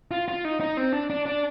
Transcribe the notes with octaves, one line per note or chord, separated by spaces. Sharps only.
F4
F4
D#4
D#4
C4
D4
D4
D4